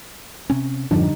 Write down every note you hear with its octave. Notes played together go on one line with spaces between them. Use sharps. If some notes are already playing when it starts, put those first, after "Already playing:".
C3 C4 C#4
F2 G#2 D3 F3 G3 D4 D#4